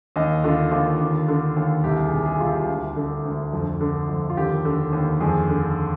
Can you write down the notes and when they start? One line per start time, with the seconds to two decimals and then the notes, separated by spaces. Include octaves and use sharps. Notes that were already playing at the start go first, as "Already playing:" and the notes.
0.16 D#2 D#5
0.44 D3 F4
0.71 D#2 F4
1.00 D#2
1.29 D3
1.56 D#2
1.84 C2 G4
2.05 G#4
2.12 C3
2.26 G#4
2.40 C2 F4
2.48 G4
2.69 D2
2.96 D3
3.25 D2
3.53 F2
3.81 D3
4.09 F2
4.30 F4
4.37 D#2 G4
4.65 D3
4.93 D#2
5.20 F2 G#4
5.49 D3